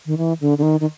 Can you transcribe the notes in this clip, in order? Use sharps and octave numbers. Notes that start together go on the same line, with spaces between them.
D#3
E3
D3
D3
D#3
D#3